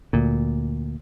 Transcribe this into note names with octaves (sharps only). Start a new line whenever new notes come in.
D2 A#2